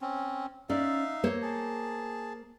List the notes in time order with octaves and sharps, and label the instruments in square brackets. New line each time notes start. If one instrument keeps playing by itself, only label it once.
[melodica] C4 C#4
[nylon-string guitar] C#4 D5 [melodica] D#4 E5 F5
[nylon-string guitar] A#3 C5 C#5
[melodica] G#4 A5